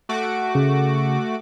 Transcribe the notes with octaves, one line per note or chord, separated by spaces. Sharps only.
A3 F#4 D6
C#3